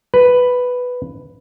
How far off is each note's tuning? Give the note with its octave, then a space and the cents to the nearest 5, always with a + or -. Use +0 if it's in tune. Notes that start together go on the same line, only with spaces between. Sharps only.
B4 +5